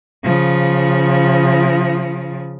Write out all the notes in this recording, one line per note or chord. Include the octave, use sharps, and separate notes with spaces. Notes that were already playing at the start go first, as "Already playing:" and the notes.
C#3 F3